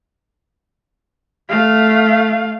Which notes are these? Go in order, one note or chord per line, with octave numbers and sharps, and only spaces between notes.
A3 F5